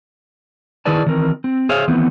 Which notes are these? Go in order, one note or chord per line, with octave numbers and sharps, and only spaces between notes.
D#3 E4 G#4 B4 D5 A5
D#3 E3 C4 A#4
C4
G#4 C5 C#5 E5 F5
D#3 E3 A3 B3 C4